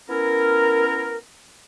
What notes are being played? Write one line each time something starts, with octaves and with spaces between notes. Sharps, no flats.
B3 C#4 E4 A#4